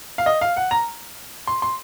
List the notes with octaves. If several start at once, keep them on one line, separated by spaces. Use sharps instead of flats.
F5
D#5
F5
F#5
A#5
C6
C6